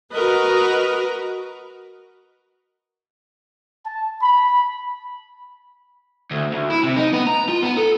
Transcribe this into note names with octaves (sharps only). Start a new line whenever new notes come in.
F#4 A#4 B4 D#5
A5
B5
D2
D2
E4
C3
D#4
B3
A#5
F4
B3
A4